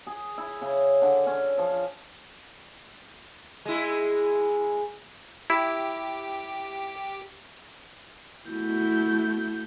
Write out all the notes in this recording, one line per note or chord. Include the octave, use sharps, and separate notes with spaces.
G#4
E4
C#3
D3
C#4
F3
G#3 E4
E4 G4
A3 E4 F#4 G6